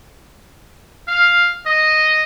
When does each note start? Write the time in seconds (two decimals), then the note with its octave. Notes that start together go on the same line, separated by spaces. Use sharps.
1.08 F5
1.66 D#5